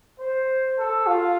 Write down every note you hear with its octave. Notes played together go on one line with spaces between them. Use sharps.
C5
A4
F4